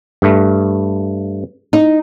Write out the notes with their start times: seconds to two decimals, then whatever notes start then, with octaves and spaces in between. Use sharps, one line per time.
0.22 G2 A3
1.73 D#4